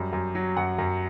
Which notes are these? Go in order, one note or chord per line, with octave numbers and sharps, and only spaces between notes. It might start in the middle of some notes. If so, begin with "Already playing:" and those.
Already playing: F#2 G3
F#2
F#3
F#2 F#5
F#2